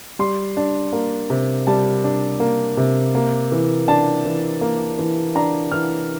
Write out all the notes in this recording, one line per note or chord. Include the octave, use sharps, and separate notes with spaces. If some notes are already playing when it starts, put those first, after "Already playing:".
G3 C6
D4
A#3
C3
G3 A5
D4
A#3
C3
A#3
E3
D4 A5
E3
A#3
E3
D4 A#5
E3 F6